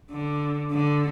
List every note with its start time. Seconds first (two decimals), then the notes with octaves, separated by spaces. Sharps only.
0.11 D3
0.71 D3